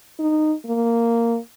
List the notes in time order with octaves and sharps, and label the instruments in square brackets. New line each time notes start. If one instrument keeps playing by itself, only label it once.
[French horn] D#4
A#3